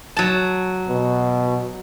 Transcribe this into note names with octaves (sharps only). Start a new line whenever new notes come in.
F#3 A5
B2